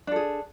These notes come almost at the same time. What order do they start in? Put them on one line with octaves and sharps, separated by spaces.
D4 A4 G#4